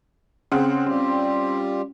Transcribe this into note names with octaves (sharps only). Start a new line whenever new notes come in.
C#3 C4 C#4 F#5
G3 C4 F4 G4